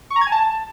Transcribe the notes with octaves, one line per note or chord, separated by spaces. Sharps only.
C#6
A#5
G#6
G#5
A5